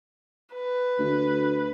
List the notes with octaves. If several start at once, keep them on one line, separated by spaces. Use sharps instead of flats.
B4
D2